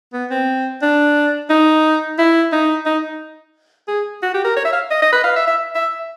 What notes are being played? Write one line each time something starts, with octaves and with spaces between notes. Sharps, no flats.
B3
C4
D4
D#4
E4
D#4
D#4
G#4
F#4
G4
A#4
C#5
E5
F5
D#5
D#5
B4
F5
E5
E5
E5